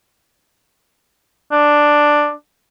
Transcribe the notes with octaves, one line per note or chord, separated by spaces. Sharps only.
D4